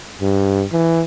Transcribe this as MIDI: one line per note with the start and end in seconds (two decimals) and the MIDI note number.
0.22 0.64 43
0.72 1.03 52